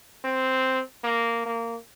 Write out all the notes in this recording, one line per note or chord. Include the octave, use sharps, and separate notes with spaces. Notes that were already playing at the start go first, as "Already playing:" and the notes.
C4
A#3
A#3